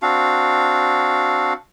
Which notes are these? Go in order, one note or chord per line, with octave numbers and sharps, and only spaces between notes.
C4 D4 F#4 F5